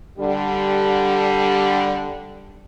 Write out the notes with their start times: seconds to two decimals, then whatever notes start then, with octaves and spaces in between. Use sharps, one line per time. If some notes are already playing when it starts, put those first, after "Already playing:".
0.18 D3 G3